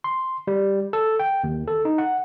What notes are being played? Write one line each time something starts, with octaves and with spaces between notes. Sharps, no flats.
C6
G3
A4
G5
D#2
A4
D#4
F#5